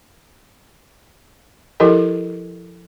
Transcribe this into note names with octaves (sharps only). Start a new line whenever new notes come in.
F3 E4 G4 A4 A#4 D#5